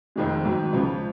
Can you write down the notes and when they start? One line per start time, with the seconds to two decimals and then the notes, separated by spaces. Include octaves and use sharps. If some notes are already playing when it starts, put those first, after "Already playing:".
0.16 F1 F2 D#3 G#3
0.44 G#1 G#2 D#3 F#3
0.73 C#2 C#3 F3